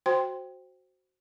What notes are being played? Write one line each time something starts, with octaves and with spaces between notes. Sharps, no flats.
F#4 C5 G5 C6